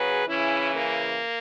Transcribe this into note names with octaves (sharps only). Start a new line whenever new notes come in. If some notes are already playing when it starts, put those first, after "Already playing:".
Already playing: C#3 F#3 G#4 B4
C#3 E3 C#4 E4
A#3